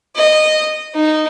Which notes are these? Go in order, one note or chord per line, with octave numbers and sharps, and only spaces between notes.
D#5
D#4